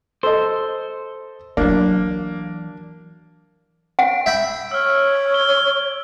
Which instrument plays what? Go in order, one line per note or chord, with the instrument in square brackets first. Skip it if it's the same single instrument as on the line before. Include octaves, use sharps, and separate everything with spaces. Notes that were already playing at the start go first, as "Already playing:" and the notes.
[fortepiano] A4 D#5 [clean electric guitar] C5
[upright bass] E3 F#3 [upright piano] A#3 [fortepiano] D4
[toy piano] F#5 [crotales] D7
[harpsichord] E5 G5 B5
[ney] C#5 [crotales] E6 F6
[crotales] G7